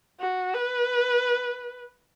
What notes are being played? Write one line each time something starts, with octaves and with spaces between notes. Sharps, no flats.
F#4
B4